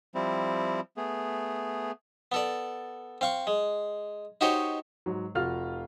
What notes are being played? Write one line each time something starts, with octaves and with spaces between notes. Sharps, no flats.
F3 G3 C4 E4
A3 B3 G#4
B3 A4 D5
C4 F5 C#6
G#3
D#4 F#4 G4 C5 C#5 D#5
G#2 F#3
F1 F4 F#4 F6